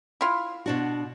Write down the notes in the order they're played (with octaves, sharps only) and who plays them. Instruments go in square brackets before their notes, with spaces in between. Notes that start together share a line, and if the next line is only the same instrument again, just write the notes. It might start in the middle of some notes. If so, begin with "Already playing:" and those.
[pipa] E4 F4
[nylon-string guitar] B2 D4 F#4